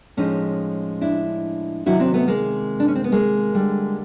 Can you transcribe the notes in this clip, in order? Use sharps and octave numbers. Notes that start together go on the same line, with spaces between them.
A2 F3 G#3 C#4 D#4
D4 E4
C3 D#3 F#3 E4 F#4
C4 D4
A3 B3
G#3 A#3
D4
C#4
C4
B3
G#3 A#3
D3 G3